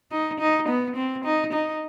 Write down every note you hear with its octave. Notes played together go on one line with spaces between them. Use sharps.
D#4
D#4
B3
C4
D#4
D#4